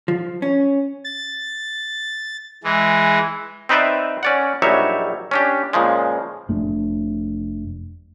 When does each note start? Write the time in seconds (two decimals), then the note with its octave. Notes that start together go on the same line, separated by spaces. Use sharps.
0.08 F3
0.42 C#4
1.04 A6
2.64 E3 G#3
3.69 C4 D#4 B4 C5 D5 E5
4.23 C#4 D5 F#5
4.62 A#1 F#3 G3 D#4 C#5 E5
5.31 C#4 D4 G4
5.73 A#2 C#3 F3 G#3
6.49 F1 A3 D4